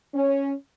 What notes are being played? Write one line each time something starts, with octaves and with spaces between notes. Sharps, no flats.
C#4